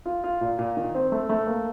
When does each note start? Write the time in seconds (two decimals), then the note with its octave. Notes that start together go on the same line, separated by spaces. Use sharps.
0.05 F4
0.24 F4
0.41 A#2
0.59 A#2
0.77 D#3
0.94 C4
1.12 A3
1.29 A3
1.47 A#3